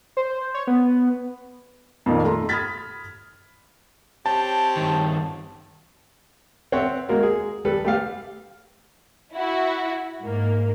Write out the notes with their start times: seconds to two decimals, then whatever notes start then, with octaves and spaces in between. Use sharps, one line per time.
0.17 C5
0.54 C#5
0.67 B3
2.06 F2 A#2 D#3
2.24 A3 A#5 C6
2.49 B5 D#6 F6 G#6 A6 B6
4.26 C4 G4 C#5 A5
4.77 G2 D#3
6.72 C4 C#5 E5 F#5
7.09 G#3 A#3 F#4 A#4
7.23 G#4
7.65 G3 A4 B4
7.85 A3 G4 F5
9.33 E4 F#4
10.22 G#2 A#3